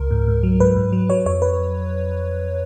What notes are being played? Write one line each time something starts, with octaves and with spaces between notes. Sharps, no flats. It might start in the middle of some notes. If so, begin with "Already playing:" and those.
Already playing: C#2 A#4
G#2
G#2
F#3
G#2 B4
G#2
F#3
F#3 C#5
F2 C#5
B4